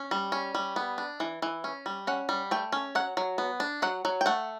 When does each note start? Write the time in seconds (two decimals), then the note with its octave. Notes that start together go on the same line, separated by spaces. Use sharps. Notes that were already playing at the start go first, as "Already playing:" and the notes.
Already playing: C#4
0.11 G3
0.32 C#4
0.55 G3
0.76 B3
0.98 D4
1.20 E3
1.42 E3
1.64 C#4
1.86 G3
2.07 C#4 F#5
2.29 G3
2.51 A3 G5
2.72 C#4
2.95 F#3 F#5
3.17 F#3
3.38 B3
3.60 D4
3.82 F#3 F#5
4.05 F#3
4.21 G5
4.26 A3 F#5